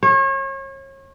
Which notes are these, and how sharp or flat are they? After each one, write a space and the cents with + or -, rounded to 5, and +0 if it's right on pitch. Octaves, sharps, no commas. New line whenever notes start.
C#5 -35